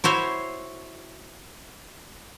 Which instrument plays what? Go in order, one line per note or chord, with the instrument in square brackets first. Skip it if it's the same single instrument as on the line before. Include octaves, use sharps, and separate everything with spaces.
[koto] E4 F#4 C5 C#5